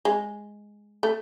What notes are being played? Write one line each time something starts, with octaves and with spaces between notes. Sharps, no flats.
G#3
A3